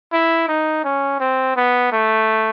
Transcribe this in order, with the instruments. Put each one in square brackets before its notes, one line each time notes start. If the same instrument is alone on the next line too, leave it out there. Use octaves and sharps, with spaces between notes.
[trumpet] E4
D#4
C#4
C4
B3
A3